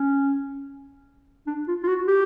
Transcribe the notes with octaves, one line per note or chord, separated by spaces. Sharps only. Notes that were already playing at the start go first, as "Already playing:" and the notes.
Already playing: C#4
D4
F4
F4
F#4
G4